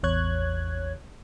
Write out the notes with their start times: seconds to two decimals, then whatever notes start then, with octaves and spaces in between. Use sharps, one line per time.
0.03 A1 E2 C#5 F#6 G#6